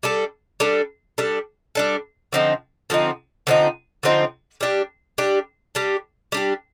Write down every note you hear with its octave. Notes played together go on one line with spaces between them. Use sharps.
G3 D4 A4
G3 D4 A4
G3 D4 A4
G3 D4 A4
D3 F3 C4 D#4
D3 F3 C4 D#4
D3 F3 C4 D#4
D3 F3 C4 D#4
G3 D4 G4
G3 D4 G4
G3 D4 G4
G3 D4 G4